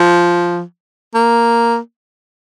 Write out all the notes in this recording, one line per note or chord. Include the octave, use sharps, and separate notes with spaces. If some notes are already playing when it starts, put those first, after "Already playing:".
Already playing: F3
A#3